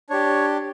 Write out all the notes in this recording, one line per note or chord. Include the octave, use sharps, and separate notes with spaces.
D4 G4 C#5